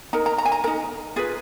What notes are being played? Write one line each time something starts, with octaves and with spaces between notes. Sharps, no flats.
D#4 A#4 A#5
A#5
A#5
G#5
A#5
D#4 A#4 A#5
F4 G#4 B4